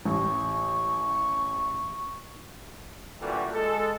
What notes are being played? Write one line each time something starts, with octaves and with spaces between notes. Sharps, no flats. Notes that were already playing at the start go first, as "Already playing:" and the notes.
A1 C#6
A#2 D3 E3 G3 A3 F#4
G#3 A4